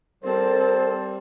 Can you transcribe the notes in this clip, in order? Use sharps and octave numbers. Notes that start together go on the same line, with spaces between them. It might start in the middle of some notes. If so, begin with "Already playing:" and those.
G3 C4 A4 A#4 C5